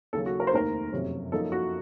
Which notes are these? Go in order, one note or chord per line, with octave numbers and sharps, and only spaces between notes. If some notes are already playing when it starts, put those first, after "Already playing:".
D#2 C#3 F#3 A4
F#4
A#4
C5
F1 D#2 D#3 A#4
F#1 F2 C3 F#3
F#2 F3 A#3 D#4 A4
F#4